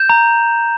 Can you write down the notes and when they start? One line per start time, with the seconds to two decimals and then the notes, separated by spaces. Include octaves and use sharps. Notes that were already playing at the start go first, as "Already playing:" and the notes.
Already playing: G6 E7
0.09 A#5